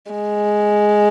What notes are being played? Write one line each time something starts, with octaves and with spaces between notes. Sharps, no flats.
G#3